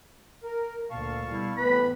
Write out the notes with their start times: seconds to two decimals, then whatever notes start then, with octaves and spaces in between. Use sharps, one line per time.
0.43 A#4
0.91 D2 A#2 F5 A5 C#6
1.28 B2 G3 E4
1.57 A1 A2 C3 E3 B3 B4 B5